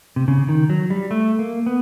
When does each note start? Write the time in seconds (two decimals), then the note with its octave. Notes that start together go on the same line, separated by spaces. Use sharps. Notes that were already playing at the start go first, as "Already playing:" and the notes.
0.16 C3
0.28 C#3
0.49 D#3
0.70 F#3
0.90 G3
1.11 A3
1.39 A#3
1.66 B3